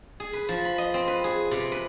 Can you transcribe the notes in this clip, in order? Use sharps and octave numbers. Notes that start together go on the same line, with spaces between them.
G#4
B4
F3
B5
D#5
C4
B4
G#4
C3
B4